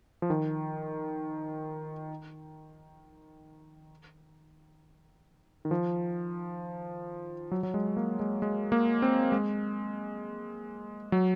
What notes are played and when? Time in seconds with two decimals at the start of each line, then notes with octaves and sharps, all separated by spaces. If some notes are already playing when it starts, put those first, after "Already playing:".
0.22 F3
0.30 D#3
5.65 D#3
5.71 F3
7.51 F#3
7.63 F#3
7.74 G#3
7.97 A#3
8.20 G#3
8.42 G#3
8.72 A#3
9.02 C4
9.32 G#3
11.12 F#3